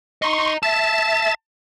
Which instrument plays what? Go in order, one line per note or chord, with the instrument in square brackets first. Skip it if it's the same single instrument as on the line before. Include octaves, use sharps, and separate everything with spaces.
[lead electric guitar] D#5 A#5 [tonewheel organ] C6 C#6
[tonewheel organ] E5 A6 [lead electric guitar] A5